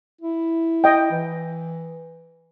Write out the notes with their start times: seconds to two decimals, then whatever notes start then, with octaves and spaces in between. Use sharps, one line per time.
0.21 E4
0.84 D#5 G5
1.11 E3